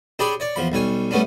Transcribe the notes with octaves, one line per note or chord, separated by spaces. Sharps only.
D4 G4 G#4 C#5 D5 B5
C#5 D5
E2 F3 B5
B1 G3 C#5 G#5
G3 A3 B3 C#4 D4